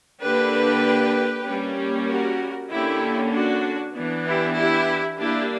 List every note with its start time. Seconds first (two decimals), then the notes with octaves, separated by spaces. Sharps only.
0.22 D3 A#3 D4 G4 B4
1.46 G3 A#3 C#4
2.08 F#4 A#4
2.71 D3 A#3 C#4 E4 G4
3.33 D4 F#4
3.95 E3 B3 D4
4.26 E4 G4
4.57 E4 G4
5.19 G3 A#3 D4 E4 G4